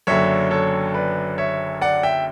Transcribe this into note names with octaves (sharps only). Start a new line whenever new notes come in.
F#1 F#2 D3 C#5 E5
A4 C#5
B4 D5
C#5 E5
D5 F#5
E5 G5